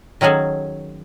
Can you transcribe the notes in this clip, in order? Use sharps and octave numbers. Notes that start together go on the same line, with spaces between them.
D#3 F#3 C#4 F#4 G#4 A4